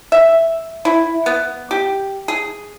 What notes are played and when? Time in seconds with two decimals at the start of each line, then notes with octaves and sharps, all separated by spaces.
0.12 E5
0.85 E4
1.26 B3
1.71 G4
2.28 G#4